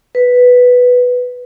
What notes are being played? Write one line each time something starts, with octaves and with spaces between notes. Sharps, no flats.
B4